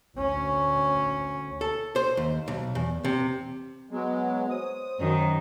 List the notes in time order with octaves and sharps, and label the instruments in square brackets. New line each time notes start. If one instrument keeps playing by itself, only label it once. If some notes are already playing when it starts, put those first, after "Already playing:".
[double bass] D2 C#4
[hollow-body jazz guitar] A4
C5
D#2
B1
E2
C3
[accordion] F#3 G#3 [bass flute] B3
[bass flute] C5 [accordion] D#6
[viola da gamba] F#2 D#3